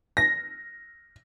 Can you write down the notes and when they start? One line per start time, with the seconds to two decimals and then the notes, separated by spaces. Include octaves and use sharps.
0.17 A#6